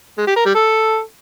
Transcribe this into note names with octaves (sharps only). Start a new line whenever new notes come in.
G#3
G4
A#4
G3
A4